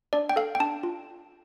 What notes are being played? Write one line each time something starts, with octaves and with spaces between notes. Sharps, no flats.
D4 D5
G5
A4 F5
G5
D4 A5
F4